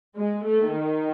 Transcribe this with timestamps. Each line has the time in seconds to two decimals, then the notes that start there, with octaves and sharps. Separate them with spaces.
0.15 G#3
0.45 A3
0.75 D#3